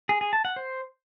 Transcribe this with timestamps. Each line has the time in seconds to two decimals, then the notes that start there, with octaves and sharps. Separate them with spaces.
0.09 G#4
0.21 G#4
0.33 A5
0.45 F#5
0.56 C5